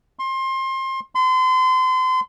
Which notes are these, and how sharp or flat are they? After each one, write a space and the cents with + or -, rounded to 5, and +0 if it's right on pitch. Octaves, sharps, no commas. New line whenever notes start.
C6 +25
C6 -35